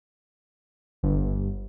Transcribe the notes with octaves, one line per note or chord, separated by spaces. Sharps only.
G1